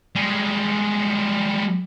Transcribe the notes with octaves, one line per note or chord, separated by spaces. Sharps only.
G3 G#3